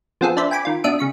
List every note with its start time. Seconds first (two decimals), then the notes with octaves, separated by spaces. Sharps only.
0.21 F3 B3 C4 F4 G#4 A4
0.37 D4 C5 D5 E5 B5
0.51 G5 G#5 B5 D6
0.65 D#3 F4
0.84 B2 D4 E5 D#6 D7
0.99 C#3 C#6 B6